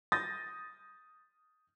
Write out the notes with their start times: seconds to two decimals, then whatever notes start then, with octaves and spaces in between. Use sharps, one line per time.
0.12 D#6 G6 A6 A#6